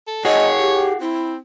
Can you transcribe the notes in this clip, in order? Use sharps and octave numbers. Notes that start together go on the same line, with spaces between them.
A4
F#4 G#4 C#5 D#5
G4
C4 E4